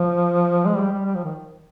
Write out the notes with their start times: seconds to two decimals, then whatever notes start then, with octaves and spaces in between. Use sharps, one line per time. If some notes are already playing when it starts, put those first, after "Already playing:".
Already playing: F3
0.66 G#3
0.77 G3
0.92 G3
1.05 G3
1.15 F3
1.24 D#3